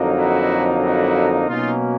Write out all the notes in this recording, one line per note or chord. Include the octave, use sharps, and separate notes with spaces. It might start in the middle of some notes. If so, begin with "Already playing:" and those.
Already playing: F2 D3 F#3 A#3 D#4
E4 F#4
E4 F#4
B2 F#3 A#3 C#4 D#4 F4